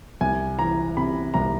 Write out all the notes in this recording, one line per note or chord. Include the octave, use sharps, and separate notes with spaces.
C2 G#5
E3 A#5
C3 B5
C2 A#5